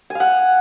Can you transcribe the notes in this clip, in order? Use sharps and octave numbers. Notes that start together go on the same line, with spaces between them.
F5 F#5 G#5